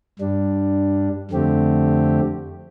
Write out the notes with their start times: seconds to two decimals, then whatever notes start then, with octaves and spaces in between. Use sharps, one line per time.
0.19 G2 G3 D4
1.31 F2 D3 A3 C4 G4